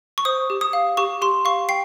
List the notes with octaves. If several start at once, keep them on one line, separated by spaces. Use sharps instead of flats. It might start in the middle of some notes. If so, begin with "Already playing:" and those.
C#6
C5 D#6
G4
D#6
F5
G4 C#6
G4 C6
F5 C#6
G5 C7